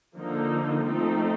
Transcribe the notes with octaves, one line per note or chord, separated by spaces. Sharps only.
D3 F3 A#3 D#4
F3 A3 C4 D#4